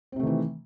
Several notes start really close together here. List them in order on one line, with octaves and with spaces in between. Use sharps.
C4 C3 A3 D#3 E3